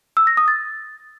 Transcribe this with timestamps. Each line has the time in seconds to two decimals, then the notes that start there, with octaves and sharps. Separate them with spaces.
0.17 E6
0.27 A#6
0.37 D#6
0.48 A6